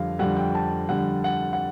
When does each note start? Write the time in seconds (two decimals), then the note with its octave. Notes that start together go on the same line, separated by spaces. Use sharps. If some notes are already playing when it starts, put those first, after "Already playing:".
Already playing: F2 D3 G3 F5
0.19 F2 D3 G3 F#5
0.37 G5
0.55 A5
0.89 F2 D3 G3 F#5
1.24 F#5
1.53 F#5